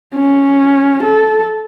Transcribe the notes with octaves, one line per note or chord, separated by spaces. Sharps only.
C#4
A4